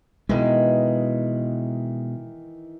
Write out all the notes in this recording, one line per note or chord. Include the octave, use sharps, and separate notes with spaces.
B2 D#3 E3 G#3